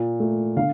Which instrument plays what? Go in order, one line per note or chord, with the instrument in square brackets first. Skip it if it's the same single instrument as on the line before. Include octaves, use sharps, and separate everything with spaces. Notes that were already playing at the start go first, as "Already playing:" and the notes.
Already playing: [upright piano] A#2
A3
D3 F5